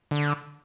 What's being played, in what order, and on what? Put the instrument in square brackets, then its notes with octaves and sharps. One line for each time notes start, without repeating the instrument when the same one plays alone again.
[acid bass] D3